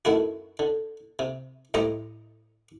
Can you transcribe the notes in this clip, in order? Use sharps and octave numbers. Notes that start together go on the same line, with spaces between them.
F#2 D#3 A3 E4 F#4
D3
C3
A2 G3 C5 D#5 A#5